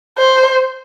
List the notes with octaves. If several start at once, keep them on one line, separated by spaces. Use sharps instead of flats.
C5